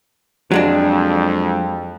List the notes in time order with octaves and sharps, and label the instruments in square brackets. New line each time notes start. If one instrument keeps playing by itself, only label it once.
[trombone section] F2 [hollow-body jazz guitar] F#3 G#3 D4